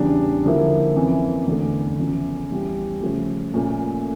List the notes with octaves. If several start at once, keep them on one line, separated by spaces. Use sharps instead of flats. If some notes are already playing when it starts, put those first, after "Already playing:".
Already playing: E2 C#3 G3 D4
D3 F3 A#3 E4
F2 E3 A#3 C#4
E2 D3 A3
E2 C#3 F3 C#4 E4
E2 E3 G3 C#4
C#3 F3 A3
A#2 A3 C#4